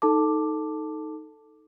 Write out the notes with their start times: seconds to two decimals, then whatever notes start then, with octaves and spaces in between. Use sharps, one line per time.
0.02 D#4 A4 A5 D6